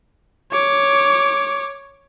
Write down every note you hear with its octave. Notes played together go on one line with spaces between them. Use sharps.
C#5 D6